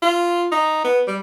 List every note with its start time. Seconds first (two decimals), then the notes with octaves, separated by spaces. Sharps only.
0.02 F4
0.52 D#4
0.84 B3
1.08 G3